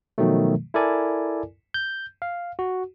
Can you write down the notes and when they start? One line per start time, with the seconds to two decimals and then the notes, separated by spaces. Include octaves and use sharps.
0.18 B2 D#3 F3 F#3 A3
0.74 E4 A4 A#4 D5 G#5
1.74 G6
2.22 F5
2.59 F#4